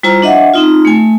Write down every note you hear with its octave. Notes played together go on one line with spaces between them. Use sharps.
G3 E4 F4 C5 A#5
D4 D#5 E5 F#5
C4 D#4 F4
A3 G#5